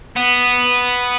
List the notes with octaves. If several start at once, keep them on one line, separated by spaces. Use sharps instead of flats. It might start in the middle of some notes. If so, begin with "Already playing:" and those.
B3